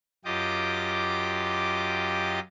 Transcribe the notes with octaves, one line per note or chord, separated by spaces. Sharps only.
F#2 F4 G4 D#5 D6